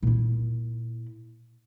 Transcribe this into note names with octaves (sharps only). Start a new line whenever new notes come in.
A#2 E4